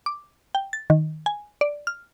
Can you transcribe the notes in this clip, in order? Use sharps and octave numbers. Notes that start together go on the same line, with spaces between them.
D6
G5
A6
D#3
G#5
D5
F6